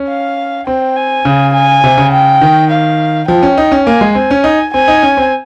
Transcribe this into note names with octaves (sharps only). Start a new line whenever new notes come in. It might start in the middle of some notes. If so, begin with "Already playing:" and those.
Already playing: C#4
F5
C4 G5
G#5
C#3
G#5
C3
C#3
G5
D#3
F5
F3 G5
C#4
D#4
C#4
A#3 G#5
G#3
C4 G#5
C#4
D#4
C4 G#5
D#4
C#4
C4